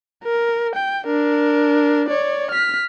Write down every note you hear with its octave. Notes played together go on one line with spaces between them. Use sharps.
A#4
G5
D4 A#4
C#5 D5
F6 B6